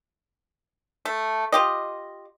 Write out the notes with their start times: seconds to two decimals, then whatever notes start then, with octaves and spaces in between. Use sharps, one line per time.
1.05 A3
1.52 F4 G4 D#5